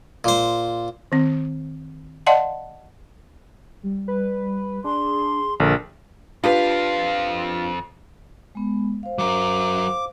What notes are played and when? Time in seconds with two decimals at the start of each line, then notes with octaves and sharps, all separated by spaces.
0.24 A#2 C5
1.12 D#3 C4
2.26 D5 D#5 F5 F#5 A5 C6
3.83 G3
4.08 B4
4.84 D4 G#4 C6
5.60 A#1 D3 A#4 A6
6.44 F2 D4 F4 G4 B4 F5
8.55 G#3 B3
9.03 C5 F5
9.19 F#3 A#4 D6